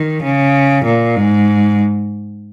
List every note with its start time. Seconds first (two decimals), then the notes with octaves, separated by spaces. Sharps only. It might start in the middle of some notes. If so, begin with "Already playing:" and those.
Already playing: D#3
0.23 C#3
0.85 A#2
1.16 G#2